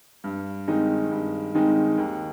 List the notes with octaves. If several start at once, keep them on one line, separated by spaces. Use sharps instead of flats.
G2
D#3 G#3 C4 D#4
G2
D#3 G#3 C4 D#4
D#2